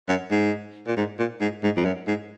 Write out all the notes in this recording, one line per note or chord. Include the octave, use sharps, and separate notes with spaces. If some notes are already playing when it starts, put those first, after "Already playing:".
F#2
G#2
A#2
G#2
A#2
G#2
G#2
F2
F#2
G#2